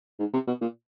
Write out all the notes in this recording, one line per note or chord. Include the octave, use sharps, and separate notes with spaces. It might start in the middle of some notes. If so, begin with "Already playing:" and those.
G#2
C3
B2
A#2